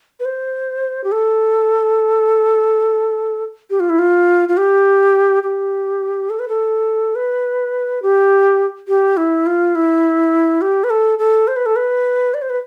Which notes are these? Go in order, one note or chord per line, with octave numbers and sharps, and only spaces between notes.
B4
C5
G4
A4
G4
F4
E4
F4
F4
G4
G4
A4
B4
A4
B4
G4
G4
E4
F4
E4
G4
B4
A4
A4
C5
B4
A4
B4
D5
C5
B4